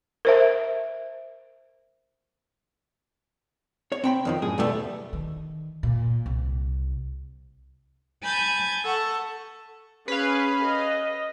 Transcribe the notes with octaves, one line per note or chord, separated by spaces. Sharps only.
A#4 C5 E5
C#5
C4 G5 B5
F2 D#3 F3
F#2 A2 G#4
D#2 B2 G3 A3 B3
D#3
A#2
C2
G#5 A5 B5 G6 G#6
A4 F#5 C#6
C#4 G#4 B4 F5
D#5